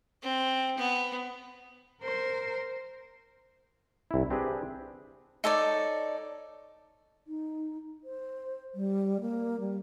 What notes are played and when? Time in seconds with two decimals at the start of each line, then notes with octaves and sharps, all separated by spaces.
0.23 C4
0.77 B3
2.02 A#4 C5
4.11 C2 E4
4.30 C4 D4 G4 G#4 B4
5.44 D#4 A4 C#5 D5
7.27 D#4
8.04 C5
8.75 G3
9.21 A#3
9.60 G3